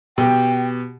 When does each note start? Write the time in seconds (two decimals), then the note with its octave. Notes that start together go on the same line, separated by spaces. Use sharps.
0.18 B2 G4 G5